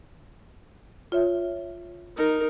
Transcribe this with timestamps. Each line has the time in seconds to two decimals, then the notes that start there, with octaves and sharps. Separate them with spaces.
1.12 F4 C#5 E5
2.17 D#4 A#4